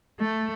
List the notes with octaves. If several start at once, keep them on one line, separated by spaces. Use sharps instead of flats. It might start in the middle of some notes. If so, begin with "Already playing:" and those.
A3